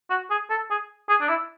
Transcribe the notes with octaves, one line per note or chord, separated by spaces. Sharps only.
F#4
G#4
A4
G#4
G#4
D4
E4